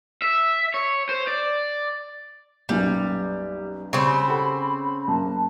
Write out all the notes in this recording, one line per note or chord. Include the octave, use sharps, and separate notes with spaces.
E5
C#5
C5
D5
B1 F#2 A#2 G3
C#3 G3 C4 B5
G4 A4 F#5
F#2 A#3 A5